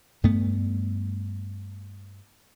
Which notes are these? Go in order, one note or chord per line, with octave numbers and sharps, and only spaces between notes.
G2 A3 B3